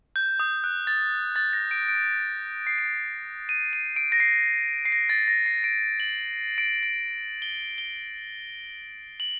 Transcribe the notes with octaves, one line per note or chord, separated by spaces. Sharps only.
G6
D#6
F#6
A6
A6
A#6
D7
D7
C7
D7
D#7
D#7
D7
A#6
C7
C7
A#6
A6
A#6
C7
D7
F#7
D7
D7
G7
G7
F#7